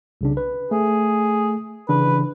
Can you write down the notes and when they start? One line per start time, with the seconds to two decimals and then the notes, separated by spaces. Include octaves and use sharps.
0.21 C2 C#3 D4
0.37 B4
0.71 A3 G#4
1.89 C#3 E3 D4 B4